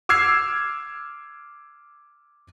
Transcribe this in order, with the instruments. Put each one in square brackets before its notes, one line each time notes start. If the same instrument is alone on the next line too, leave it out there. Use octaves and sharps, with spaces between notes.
[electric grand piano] D6 E6 F6 G#6 C7